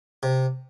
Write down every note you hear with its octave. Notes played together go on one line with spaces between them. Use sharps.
C3